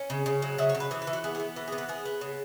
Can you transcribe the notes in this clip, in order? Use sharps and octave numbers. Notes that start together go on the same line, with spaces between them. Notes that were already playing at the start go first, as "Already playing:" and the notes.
Already playing: C#4
C#3
C#3
F#3
C#3 E5
C#5
C#3
B4
E3 G#4
B4
E3
F#4
B3 G#4
G#4
B3
E3 B4
G#4
B3
B4
B3 G#4
B3
C#3